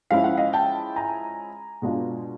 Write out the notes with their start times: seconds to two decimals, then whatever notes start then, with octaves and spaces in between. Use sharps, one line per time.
0.11 F3 G#3 C#4 E4 F5
0.24 F#5
0.37 D#5 F5
0.53 G5 A5
0.96 G#5 A#5
1.82 B2 G#3 B3 D4 F4